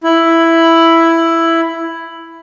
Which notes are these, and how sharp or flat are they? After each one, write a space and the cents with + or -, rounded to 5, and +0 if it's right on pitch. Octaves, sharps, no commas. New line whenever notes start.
E4 +5